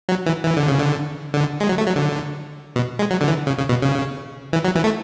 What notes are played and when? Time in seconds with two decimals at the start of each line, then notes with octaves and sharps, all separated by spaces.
0.09 F#3
0.26 E3
0.44 E3
0.57 D3
0.68 C#3
0.79 D3
1.34 D3
1.60 G#3
1.69 F#3
1.78 A3
1.87 F#3
1.96 D3
2.76 B2
2.99 G#3
3.11 F#3
3.21 D3
3.28 E3
3.47 C#3
3.57 C#3
3.69 B2
3.82 C#3
4.53 E3
4.65 F#3
4.76 E3
4.84 A3